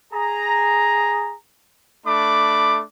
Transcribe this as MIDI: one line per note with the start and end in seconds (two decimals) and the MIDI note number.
0.13 1.35 68
0.13 1.35 82
2.05 2.82 57
2.05 2.82 62
2.05 2.82 83
2.05 2.82 86